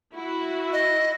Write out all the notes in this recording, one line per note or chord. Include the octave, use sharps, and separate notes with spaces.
E4 F#4
D#5